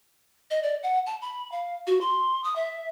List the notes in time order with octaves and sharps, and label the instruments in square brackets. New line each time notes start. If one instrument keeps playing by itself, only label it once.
[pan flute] D#5
D5
F#5
A5
B5
F5
F#4
C6
D#6
E5